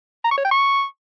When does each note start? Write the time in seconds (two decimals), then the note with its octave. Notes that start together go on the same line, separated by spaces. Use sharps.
0.24 A#5
0.31 C#6
0.38 C#5
0.44 G5
0.51 C#6